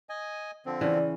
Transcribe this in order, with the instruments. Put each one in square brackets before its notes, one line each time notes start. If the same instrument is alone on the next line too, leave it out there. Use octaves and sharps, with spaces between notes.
[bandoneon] D#5 G#5
D3 F3 C4
[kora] C#3 E3 [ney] D5